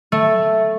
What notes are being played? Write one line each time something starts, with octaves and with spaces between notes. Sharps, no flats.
A3